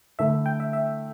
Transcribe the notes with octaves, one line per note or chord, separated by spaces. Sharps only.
D3 A3 E4 E5
G5
E5
E5